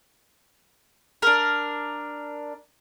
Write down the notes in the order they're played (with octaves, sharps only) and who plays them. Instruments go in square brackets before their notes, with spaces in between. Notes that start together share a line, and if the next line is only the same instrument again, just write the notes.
[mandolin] D4 A#4